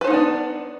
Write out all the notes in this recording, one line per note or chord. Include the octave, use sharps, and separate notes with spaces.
B3 D4 D#4 B4 C5